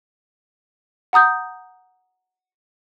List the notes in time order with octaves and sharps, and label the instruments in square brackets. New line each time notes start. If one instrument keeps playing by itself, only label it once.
[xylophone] F#5 A#5 D#6 G6